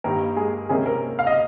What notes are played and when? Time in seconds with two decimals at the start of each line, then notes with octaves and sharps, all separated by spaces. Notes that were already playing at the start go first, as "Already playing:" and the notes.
0.04 G2 D#3 G3 A#3 A#4
0.37 G#3 G#4
0.69 C3 D#3 G#3 A#3 C#4 G#4
0.86 A#3 A#4
1.19 F5
1.27 D#5